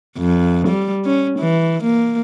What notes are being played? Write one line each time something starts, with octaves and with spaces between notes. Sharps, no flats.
F2
G3
C#4
E3
A#3